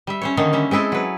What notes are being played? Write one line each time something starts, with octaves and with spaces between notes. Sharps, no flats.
G3 E5
C#4 C5 C#5
D3 D#3 A#3 C#4 D#4
G3 C#4 E5
G#3 C4 E4 G#4 A4
F#3 B4